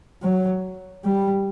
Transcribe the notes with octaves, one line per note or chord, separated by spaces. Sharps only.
F#3
G3